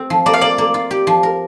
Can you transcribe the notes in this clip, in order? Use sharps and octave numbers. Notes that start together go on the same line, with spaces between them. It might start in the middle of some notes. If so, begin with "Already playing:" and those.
Already playing: C4
F3
A#3 D5
F5
A#3 D5
A#3
F4
G4
F3
A#4